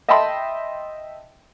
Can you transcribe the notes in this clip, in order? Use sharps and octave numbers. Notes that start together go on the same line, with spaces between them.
D#5 E5 G5 A5 B5 C6